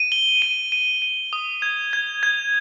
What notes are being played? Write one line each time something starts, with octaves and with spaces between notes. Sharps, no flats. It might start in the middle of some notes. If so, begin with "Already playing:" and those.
Already playing: D#7
G7
D#7
D#7
D#7
D#6
G#6
G#6
G#6